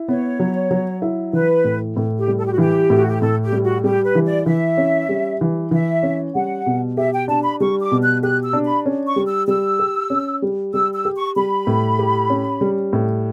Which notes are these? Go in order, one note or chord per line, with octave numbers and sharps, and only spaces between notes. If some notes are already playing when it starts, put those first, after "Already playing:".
Already playing: E4
B3 C#5
F#3
F#3
E4
E3 B4
A2
A2
G4
G3
A4
G4
F#4
E3 G4
A2 F#4
G4
A2 A4
G4
G3
F#4
G3 G4
B4
E3
D5
E3 E5
C#4
G3
E3
E3 E5
C#4
G3 F#5
B2
G4 E5
G5
D4 A5
B5
G3 C#6
D6
B2
F#6
G4 F#6
E6
D4
B5
C#4
C#6
G3
E6
G3 E6
G4
C#4
G3
G3 E6
E6
G4
C#6
G3 B5
A2
G4
C#4
G3
A2